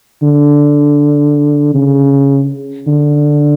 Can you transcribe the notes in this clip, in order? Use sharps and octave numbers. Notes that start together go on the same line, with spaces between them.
D3
C#3
D3